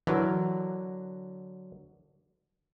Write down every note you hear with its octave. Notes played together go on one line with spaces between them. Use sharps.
D3 E3 F#3 A#4